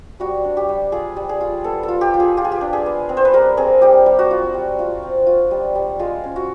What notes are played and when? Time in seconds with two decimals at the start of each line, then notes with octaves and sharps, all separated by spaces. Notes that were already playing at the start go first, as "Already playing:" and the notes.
0.20 G3 F#4
0.44 D4
0.57 G4
0.69 G3
0.92 F4 G#4
1.16 G3
1.29 G#4
1.41 F4
1.64 B3 A4
1.83 A4
1.88 F4
2.01 G4
2.14 F4
2.20 G#4
2.37 F4 G4
2.45 G#4
2.52 G4
2.61 D4
2.73 G#4
2.86 B3
3.09 C4
3.17 C5
3.25 B4
3.33 G3 A#4
3.57 C4 G#4
3.81 G3 G4
4.06 G3
4.19 F#4
4.31 F4
4.54 G3
4.79 F4
5.03 C4
5.26 F4
5.51 G3
5.75 G3
5.99 G#3 F4
6.24 C#4
6.36 F#4